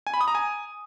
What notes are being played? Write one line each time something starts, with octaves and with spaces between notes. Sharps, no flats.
G#5
B5
D#6
A#5
G#5